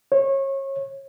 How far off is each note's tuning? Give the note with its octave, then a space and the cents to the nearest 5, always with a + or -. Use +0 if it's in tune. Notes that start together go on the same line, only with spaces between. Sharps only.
C#5 -30